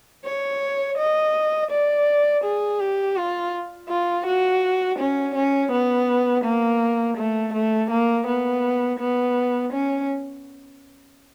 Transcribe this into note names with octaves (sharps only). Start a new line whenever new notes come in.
C#5
D#5
D5
G#4
G4
F4
F4
F#4
C#4
C#4
B3
A#3
A3
A3
A#3
B3
B3
C#4